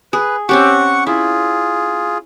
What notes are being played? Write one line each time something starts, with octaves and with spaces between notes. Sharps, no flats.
G#4 B4
C4 C#4 G4 F#5 C#6
E4 F4 G#4